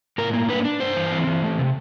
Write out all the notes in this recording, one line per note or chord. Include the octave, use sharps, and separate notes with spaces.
A2 A#4
A#3
D4 B4
D4
G2 C5
E3
C4
E3
A3
C3